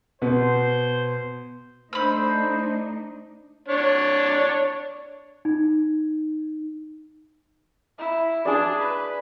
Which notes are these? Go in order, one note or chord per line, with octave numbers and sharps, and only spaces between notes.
B2 B3 C5
A3 D4 D#4 C5 B5 E6
D4 C#5
D#4
E4
D4 G#4 D5
B4